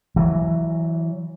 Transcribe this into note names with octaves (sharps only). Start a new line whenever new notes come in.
E3 F#3